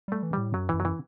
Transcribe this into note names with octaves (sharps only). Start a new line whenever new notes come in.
G3 A3
E3
A2 G3
F#2 F#3
F#2 E3
F#3
E3